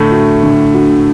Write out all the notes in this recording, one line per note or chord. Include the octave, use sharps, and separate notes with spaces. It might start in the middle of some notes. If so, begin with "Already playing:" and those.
Already playing: A2 D3 A3
F#4
D3
F#4